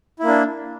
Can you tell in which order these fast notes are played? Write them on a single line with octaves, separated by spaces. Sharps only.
E4 A#3 D4